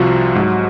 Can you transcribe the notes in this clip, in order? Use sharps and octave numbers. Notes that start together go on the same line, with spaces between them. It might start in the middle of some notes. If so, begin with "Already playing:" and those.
Already playing: C2 C3 F3 F4 F#4
G#2 F#3